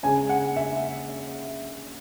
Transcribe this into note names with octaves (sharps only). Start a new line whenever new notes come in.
C#3 G#3 G#5
F#5
E5